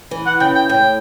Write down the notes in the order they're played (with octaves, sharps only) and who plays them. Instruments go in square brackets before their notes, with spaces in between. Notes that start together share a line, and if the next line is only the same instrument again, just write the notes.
[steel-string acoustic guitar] E3
[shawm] F#5
[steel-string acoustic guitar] C#3 [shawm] G5
[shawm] G5
[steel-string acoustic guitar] A2 [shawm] G5